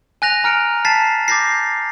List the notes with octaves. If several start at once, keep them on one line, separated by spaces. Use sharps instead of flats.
G#5 F#6 A#6 F7
G#5 A#5 F6 C#7 D7
A5 A6 B6 C7
D6 G6 A6 A#6 C7